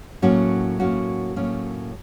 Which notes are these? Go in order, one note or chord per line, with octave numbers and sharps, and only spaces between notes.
A2 F#3 A#3 C#4 F#4
A2 F#3 A#3 C#4 F#4
A2 F#3 A#3 C#4